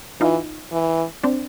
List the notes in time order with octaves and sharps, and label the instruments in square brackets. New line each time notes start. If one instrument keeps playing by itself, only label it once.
[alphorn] E3 [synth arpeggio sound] D#4 F4
[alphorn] E3
[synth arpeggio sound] C4 D4